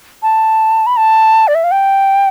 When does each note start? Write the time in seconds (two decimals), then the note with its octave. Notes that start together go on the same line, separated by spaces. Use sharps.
0.23 A5
0.86 B5
0.97 A5
1.48 D5
1.55 E5
1.64 F5
1.71 G5